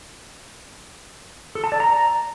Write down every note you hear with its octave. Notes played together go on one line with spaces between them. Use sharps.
A4
A5
D5
A#5